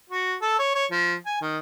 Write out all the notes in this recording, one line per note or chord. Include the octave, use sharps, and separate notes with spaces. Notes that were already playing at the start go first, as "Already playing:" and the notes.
F#4
A4
C#5
C#5
F3
G#5
D#3